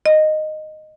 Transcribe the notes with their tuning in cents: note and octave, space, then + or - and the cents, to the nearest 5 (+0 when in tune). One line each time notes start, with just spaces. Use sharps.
D#5 -10